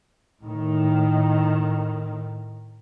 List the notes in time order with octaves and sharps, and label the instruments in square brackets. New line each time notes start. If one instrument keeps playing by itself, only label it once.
[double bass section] A2 D#3